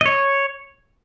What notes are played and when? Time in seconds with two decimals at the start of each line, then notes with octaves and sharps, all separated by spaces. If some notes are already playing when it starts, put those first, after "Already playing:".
0.01 D#5
0.06 C#5